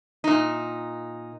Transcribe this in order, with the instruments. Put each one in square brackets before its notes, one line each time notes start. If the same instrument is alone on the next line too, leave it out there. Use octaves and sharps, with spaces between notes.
[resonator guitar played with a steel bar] A#2 D#4